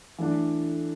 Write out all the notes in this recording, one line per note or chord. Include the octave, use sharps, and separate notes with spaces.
E3 A3 D4